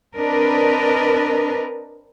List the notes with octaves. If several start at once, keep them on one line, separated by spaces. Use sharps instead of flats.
C4 D4 A#4 B4 D#5